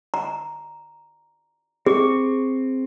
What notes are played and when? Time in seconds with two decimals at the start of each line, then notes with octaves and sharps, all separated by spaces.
0.14 A#5
1.86 C4 G#4 C#6